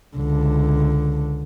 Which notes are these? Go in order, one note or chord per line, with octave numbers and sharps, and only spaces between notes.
C#2 D3